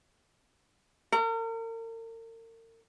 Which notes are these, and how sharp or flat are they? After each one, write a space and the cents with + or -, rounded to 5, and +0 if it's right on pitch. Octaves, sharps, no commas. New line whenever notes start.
A#4 -40